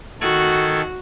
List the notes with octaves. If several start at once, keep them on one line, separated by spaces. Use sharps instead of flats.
D#3 F#4 A4 G#6